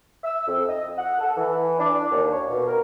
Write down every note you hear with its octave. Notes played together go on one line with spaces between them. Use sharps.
E6
F2
D#5
F#5
A4
E3
D4
D#2
C#5
B2
A#4